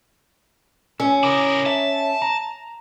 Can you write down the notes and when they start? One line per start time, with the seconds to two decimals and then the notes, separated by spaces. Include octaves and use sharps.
1.00 C#4 E6
1.23 E4 A#4 D6 D#6
1.66 E5 A5
2.22 A#5